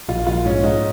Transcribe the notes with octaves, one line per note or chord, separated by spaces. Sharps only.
A#1 F4
A#1 F4
G#2 C#4
G#2 D#4